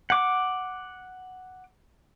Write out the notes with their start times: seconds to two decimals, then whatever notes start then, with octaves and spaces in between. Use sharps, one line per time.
0.10 F#5 D6